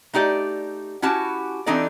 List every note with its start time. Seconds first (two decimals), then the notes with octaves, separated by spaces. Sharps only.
0.13 A3 D#4 G4 D5
1.02 C#4 E4 F#4 G4 A5
1.66 E3 C4 D4 D#4 A4 D5